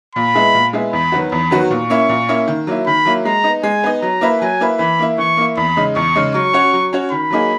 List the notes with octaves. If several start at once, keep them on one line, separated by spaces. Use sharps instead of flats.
A#2 B5
G#3 B3 E4 G#4
A#2
G#3 B3 E4 G#4
E2 B5
D#3 F#3 B3 F#4
E2 B5
D#3 F#3 B3 F#4
A#2 C#6
A#3 C#4 E4
A#2
A#3 C#4 E4
D#3
F#3 A#3 E4
D#3 B5
F#3 A#3 E4
G#3 A#5
B3 D#4
G#3 G#5
B3 D#4
F#3 A#5
A#3 E4 B4
F#3 G#5
A#3 E4 B4
E3 B5
A#3 E4
E3 C#6
A#3 E4
E2 B5
C#3 G#3 D#4
E2 C#6
C#3 G#3 D#4
F#3 C#6
C#4 F#4 C#5
F#3
C#4 F#4 C#5
D#3 B5
F#3 A#3 D#4 G#4